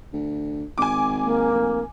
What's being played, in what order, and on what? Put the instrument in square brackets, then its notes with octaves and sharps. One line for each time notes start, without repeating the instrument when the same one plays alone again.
[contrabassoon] D2
[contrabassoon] G#1 [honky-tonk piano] G#5 D6
[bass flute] A#3
[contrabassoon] F1